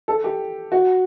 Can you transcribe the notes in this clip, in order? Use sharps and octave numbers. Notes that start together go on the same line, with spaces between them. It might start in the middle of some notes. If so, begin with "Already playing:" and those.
A4
G4
F#4